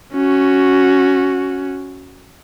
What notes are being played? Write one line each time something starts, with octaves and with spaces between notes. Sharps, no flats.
C#4 F#4